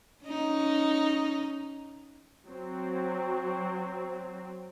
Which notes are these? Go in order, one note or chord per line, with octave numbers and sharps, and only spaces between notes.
C#4 D#4
F#3 C4